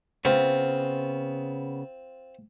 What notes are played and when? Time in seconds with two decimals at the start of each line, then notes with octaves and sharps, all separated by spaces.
0.25 C#3 B3 C4 F4